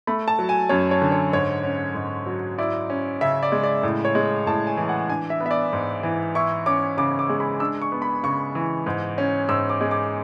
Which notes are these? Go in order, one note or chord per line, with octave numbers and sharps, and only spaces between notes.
A3 B5
A5
F#3
G#5
F#2 C#5
C#5
D3
C#5
G#2 C#5
C#4
G#2
F#3
E4 D5
C#4
C#3 E5
D5
G#3
D5
A2
C#5
G#3
A2 A5
G#5
E3
F#5
D4 G#5
E5
B3
E5
D5
G#2
E3
E4 C#6
C#4 D6
C#3 D6
D6
G#3
B5
D4 E6
C#6
B3
B5
C#3 C#6
E3
G#2
C#4
G#2 E6
D6
G#3
D6